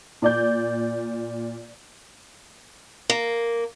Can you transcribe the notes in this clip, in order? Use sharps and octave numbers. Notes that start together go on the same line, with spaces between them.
A#2 D5 G6
A#3